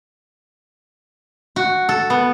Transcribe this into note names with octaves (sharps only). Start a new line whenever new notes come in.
F#4
A4
B3